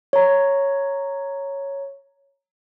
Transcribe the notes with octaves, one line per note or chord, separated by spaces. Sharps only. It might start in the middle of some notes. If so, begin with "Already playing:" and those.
C#5 A#5